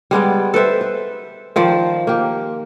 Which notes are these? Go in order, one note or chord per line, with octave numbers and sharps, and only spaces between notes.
G3 G#3 B3 D5
A4 B4 C5 E5
B4
D#3 F3 C5 D5
A#3 G4